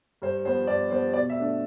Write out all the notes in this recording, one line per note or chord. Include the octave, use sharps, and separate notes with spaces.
G2 C5
F3 B3 C5
G2 D5
F3 B3 C5
B2 D5
E5
A3 D4